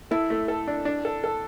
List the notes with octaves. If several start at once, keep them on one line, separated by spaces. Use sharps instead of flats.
E4 A4
A3
A4
D4
D4
A4
A4